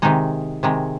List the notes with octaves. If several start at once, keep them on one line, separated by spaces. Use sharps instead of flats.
C3 D#3 G#3 D#4
C3 D#3 G#3